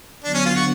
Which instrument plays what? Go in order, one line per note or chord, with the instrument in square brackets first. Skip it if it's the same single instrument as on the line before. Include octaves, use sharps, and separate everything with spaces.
[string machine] D3 F#3 B3 [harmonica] D4
[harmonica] C#4
F4
F#4